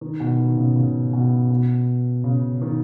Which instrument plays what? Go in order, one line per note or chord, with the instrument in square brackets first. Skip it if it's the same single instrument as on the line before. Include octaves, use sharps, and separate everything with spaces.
[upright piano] D#3
B2
D#3
C#3
C#3
B2
B2
C#3
D#3